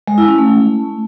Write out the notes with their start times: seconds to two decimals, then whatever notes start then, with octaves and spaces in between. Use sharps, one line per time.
0.08 G#3
0.18 E4
0.28 C#4
0.38 A3